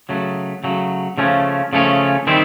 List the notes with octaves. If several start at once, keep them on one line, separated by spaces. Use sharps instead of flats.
C#3 F#3 A3
C#3 F#3 A3
C#3 F3 A3 C#4
C#3 F3 A3 C#4
D#3 G3 C4 E4